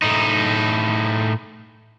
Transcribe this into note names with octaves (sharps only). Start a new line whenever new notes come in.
A2 D#4